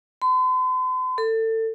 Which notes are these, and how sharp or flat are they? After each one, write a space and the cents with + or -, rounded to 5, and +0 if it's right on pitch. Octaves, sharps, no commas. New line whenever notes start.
C6 -45
A4 +25